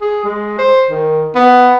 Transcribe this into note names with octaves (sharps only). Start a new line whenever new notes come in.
G#4
G#3
C5
D#3
B3